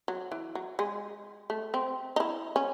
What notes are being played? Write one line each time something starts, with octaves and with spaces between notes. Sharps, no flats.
F#3
E3
F#3
G#3
A3
C4
D#4
E4
C#4